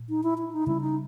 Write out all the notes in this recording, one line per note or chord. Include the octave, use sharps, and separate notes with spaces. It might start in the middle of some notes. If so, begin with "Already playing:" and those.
Already playing: A#2
D#4
E4
E4
D#4
C#3 G3 A#3 C#4 E4
D#4